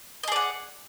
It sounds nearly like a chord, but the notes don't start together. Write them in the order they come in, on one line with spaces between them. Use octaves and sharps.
D#5 G#4 D5 F#5